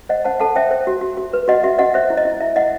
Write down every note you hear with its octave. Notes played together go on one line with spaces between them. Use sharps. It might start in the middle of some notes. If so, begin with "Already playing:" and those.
C5 D#5 F#5
C5 F#5 A5
A4 F#5 A5
C5 E5 G5
C5
F#4
F#4
F#4
B4
F#4 D#5 F#5
F#4 E5
F#4 D#5 F#5
C5 E5
E4
D#5
E4
E4 E5
E4 D#5 F#5